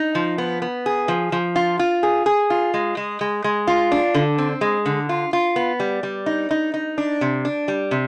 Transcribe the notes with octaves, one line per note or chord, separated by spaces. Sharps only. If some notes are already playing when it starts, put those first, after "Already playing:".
Already playing: D#4
F3
B3
B3
G#4
F3
F3
F4
F4
G#4
G#4
F4
G#3
G#3
G#3
G#3
F4
D4
D3
C4
G#3
D3
F4
F4
B3
G3
G3
D#4
D#4
D#4
D4
C3
D4
G3
C3